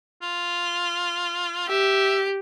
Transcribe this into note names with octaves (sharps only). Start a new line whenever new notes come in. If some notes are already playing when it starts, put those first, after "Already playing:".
F4
G4 E5